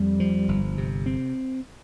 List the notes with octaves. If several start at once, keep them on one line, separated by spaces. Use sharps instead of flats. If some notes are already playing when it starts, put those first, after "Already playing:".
Already playing: F2 G3
F3
G1
C3
C4